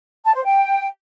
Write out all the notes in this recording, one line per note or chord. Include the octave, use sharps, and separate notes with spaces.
A5
C5
G5